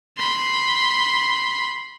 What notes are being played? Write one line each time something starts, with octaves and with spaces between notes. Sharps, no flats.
B5 C6